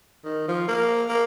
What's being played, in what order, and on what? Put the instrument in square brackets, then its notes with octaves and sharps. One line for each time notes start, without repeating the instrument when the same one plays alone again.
[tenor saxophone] D#3
F3
A#3
A#3